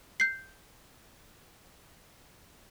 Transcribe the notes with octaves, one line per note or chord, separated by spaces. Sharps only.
G6 C7